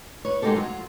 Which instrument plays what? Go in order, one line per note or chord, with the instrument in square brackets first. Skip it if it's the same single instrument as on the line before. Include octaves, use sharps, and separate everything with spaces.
[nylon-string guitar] B4 C#5
G#3 A#3 D#4 F#4 G4 A4
F#3 F4